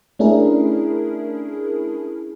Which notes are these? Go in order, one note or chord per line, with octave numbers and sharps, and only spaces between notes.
A3 C#4 D4 E4 G#4 A#4